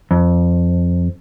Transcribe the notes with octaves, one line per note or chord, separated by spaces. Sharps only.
F2